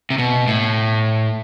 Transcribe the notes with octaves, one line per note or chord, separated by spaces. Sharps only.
C3
B2
A2